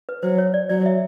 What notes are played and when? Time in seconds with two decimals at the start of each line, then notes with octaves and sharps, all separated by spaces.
0.09 B4
0.23 F#3 C5
0.38 C#5
0.54 D5
0.69 F#3 D5
0.86 E5